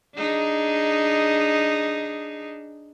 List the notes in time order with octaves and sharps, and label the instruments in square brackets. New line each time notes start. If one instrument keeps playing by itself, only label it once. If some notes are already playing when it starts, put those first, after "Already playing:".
[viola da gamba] D4 D#4 G#4